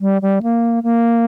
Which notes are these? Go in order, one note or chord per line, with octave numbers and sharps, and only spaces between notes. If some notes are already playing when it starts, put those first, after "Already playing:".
G3
G3
A#3
A#3